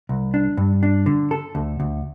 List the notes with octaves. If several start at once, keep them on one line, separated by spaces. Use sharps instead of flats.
C2
D4
G2
D4
D3
A4
D2
D2